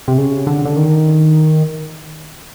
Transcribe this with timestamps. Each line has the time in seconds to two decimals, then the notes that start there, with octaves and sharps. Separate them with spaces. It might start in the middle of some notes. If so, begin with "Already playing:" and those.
0.08 C3
0.18 C#3
0.47 D3
0.65 D3
0.76 D#3